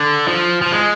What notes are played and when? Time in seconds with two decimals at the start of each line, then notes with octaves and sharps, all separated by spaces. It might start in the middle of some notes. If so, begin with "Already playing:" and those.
Already playing: D3
0.28 F3
0.62 F3
0.72 G#3